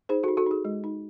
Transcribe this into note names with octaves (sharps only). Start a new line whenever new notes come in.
D#4 G#4 C5
D#4 F#4 A4
F#4 A4
D#4 G#4
G#3
D#4